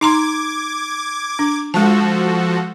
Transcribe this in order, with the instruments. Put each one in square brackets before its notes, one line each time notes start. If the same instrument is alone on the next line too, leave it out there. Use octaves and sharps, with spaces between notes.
[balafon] D#4 A#5 C6 [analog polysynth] D6 G#6
[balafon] D4
[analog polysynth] F3 F#4 A4 [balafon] G#3 A5